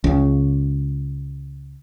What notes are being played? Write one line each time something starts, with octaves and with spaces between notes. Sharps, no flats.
C#2 C#3